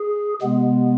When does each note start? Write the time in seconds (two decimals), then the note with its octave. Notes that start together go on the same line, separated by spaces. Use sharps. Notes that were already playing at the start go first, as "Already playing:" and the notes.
Already playing: G#4
0.41 C3 G#3 B3